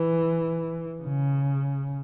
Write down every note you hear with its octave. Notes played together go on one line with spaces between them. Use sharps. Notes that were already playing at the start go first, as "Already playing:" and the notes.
Already playing: E3
C#3